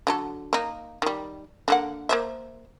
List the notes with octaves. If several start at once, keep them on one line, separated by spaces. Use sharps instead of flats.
D3 F#3 A4
A#3 D#4
D#3 G3
D3 A#3 F#5
A#3 C5 E5